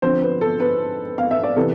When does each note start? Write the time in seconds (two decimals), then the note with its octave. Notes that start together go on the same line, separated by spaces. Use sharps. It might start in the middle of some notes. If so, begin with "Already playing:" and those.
0.02 D3 F3 C4 C5
0.22 B4
0.41 A4
0.60 B4
1.18 F5
1.31 E5
1.43 D5
1.56 C3 E3 B3 A4